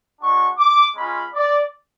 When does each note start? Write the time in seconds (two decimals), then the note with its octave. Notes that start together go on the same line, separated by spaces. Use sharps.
0.19 G#3 D4 F#4 C#6
0.58 D6
0.95 G#3 C#4 F4 B5
1.34 D5